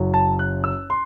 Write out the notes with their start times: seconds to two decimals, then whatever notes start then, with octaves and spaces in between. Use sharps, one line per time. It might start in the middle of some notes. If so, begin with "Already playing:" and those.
Already playing: F#1 F#2 F#3
0.14 A5
0.39 F#6
0.64 E6
0.90 C6